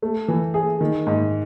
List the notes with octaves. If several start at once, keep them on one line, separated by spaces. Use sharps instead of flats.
A3
E3
G#4
D#3
G#2